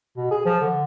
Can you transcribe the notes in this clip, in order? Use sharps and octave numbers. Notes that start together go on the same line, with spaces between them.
B2
G#4
F3
D3